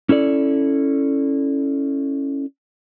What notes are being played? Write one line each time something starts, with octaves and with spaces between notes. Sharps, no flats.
C#4 E4 A4 D5